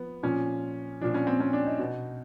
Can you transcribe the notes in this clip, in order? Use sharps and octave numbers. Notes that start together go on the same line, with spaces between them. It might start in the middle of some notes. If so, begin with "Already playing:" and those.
Already playing: F3 B3
A#2 F3 C#4
A#2 F3 D4
C#4
C4
C#4
D4
D#4
B2